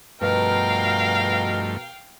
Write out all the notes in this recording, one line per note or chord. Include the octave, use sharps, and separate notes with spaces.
G2 B2 F3 A3 A#4 F5 G5